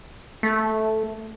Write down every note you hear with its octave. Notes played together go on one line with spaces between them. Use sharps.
A3